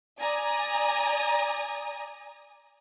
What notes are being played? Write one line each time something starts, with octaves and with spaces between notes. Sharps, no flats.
D5 G#5 A#5 D#6